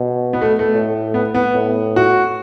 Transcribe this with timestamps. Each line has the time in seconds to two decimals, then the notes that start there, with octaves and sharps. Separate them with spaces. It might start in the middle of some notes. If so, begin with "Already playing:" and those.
Already playing: B2
0.33 B3
0.42 A3
0.59 A3
0.74 A2
1.14 B3
1.34 B3
1.55 A2
1.96 F#4